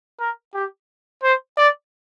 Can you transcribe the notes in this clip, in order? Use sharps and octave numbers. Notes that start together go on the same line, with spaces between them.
A#4
G4
C5
D5